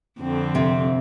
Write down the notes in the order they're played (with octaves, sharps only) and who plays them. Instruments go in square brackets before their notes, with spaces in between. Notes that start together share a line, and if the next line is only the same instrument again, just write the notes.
[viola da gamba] F2 D3 C4
[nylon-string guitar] C3